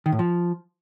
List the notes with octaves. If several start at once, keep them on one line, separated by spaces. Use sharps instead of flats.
D#3
A2
F3